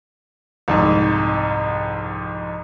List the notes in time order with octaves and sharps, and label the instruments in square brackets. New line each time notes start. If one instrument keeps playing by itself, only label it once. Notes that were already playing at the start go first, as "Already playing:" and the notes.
[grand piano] C2 F2 G#2